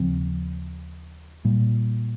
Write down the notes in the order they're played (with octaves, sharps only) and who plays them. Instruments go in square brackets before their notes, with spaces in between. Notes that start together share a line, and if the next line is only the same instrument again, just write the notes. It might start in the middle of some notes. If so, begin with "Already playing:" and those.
Already playing: [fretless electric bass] D#2 C#3 F3 C4
A#2 G3